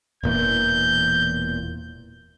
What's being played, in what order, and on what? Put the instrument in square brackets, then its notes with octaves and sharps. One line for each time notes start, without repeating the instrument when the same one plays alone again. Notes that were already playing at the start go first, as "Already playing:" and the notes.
[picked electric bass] E1 A#2 E3 [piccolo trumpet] G6